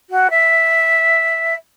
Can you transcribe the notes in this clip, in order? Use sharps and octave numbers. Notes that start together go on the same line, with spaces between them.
F#4
E5